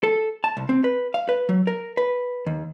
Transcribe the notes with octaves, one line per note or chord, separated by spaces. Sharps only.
A4
A5
C2
C4
B4
F5
B4
F#3
A#4
B4
D#2